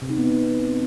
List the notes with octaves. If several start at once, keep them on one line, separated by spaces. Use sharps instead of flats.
C3
D#4
B3
C4